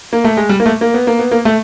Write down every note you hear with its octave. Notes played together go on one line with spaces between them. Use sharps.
A#3
A3
G#3
G3
A#3
A3
A#3
B3
A#3
B3
A#3
A3